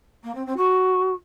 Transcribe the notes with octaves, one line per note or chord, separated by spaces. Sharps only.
A#3
C4
C4
F#4